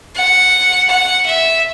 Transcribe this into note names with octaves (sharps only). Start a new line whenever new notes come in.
F#5
F#5
E5